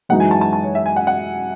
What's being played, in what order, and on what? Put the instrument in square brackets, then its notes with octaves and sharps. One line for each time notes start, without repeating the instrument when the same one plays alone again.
[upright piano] F#2 E3 G#3 D#4 F#4 [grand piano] F#5
[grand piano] G#5
A5
A5
A5
C#5
E5
G#5
F#5
F#5